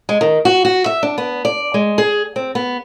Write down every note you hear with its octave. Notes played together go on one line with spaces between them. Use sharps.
G#3
D#3
F#4
F#4
E5
D4
B3
D5
G#3
G#4
C4
B3